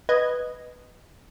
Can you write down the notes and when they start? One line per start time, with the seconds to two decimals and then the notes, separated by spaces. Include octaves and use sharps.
0.09 B4 D#5 G#6